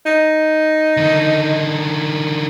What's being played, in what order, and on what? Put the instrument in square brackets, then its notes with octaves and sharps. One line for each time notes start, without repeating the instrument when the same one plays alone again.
[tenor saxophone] D#4
[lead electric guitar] D3 D#3